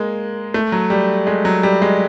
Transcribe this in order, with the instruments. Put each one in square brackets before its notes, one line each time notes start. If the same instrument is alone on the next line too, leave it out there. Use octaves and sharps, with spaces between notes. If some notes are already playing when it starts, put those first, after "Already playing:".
Already playing: [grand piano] G#3 A#3
A3
F#3
G3
G#3
F#3
G3
G#3